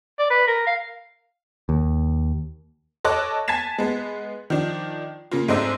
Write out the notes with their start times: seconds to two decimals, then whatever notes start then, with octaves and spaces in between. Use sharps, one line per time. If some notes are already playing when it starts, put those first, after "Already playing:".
0.19 D5
0.30 B4
0.48 A#4
0.67 F5
1.69 D#2
3.04 A4 C#5 D#5 A5 D6 F#6
3.48 G#5 A5 G#6 A6 B6 E7
3.78 G#3 B3
4.50 D#3 F3 D4
5.31 C#3 A#3 F4
5.48 G#2 A3 C4 D4 D#5 E6